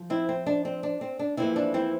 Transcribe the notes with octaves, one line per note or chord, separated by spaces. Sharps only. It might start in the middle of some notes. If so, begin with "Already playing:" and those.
Already playing: F3
C4 E4
C4
D4
C4
D4
C4
D4
F2 E3 A#3 C4 E4
D4
C4 E4